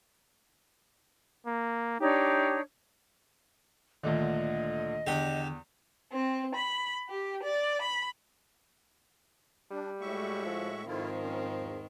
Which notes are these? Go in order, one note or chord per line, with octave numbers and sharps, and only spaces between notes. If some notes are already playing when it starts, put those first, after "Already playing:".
A#3
D4 D#4 G4 C#5
D2 A#2 D3 D#3 D#5
E2 D3 G4 G5
C4
B5
G4
D5
B5
G3 D4
A2 G#3 F#4 E5 C#6
F3
G#2 D#3 F3 A3 C4 E4 F4
C#4
E2